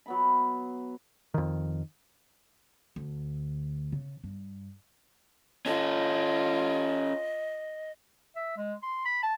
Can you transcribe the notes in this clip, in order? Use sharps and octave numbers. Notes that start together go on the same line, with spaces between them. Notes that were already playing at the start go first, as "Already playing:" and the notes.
F#3 B3 B5
F2 D#3
D2
C#3
G2
C#4 F4 A4 D#5
E5
G#3
C6
B5
A5